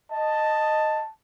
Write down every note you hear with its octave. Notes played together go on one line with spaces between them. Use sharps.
D#5 A5